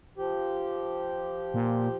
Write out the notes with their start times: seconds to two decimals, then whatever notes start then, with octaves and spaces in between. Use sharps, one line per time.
0.18 F3 G4
1.54 A#2